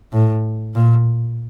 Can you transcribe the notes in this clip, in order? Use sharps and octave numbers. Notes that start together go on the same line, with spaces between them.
A2
A#2